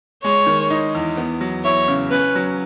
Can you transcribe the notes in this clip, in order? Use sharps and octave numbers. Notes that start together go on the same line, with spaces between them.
G#3 C#5
D#3
D#4
E2
B3
F#3
E4 C#5
C#3
C#4 B4
F#3